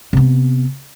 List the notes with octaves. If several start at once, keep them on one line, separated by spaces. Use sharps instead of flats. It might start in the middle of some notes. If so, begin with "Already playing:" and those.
C3 B3